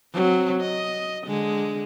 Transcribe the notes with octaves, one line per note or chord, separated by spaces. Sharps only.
F#3 C4
D#5
D3 G#3